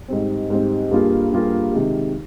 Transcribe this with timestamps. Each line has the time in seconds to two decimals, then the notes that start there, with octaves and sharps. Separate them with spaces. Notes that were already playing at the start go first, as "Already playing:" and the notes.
0.08 G#2 G3 C4
0.50 G#2 G3 C4
0.91 G2 G3 A#3 F4 G#4
1.32 G2 G3 A#3 F4 G#4
1.73 C3 D#3 G#3